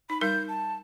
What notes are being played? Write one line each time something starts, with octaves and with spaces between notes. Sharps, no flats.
D#4 B5
G3 D#4 A#4 G6
A5